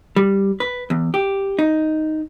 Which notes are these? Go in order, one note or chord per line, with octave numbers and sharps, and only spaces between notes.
G3
B4
E2
G4
D#4